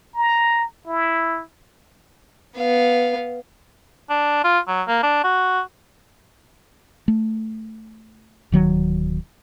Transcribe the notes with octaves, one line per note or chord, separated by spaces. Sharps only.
A#5
E4
B3 F5
D4
F4
F#3
A#3
D4
F#4
A3
D1 D#3 F#3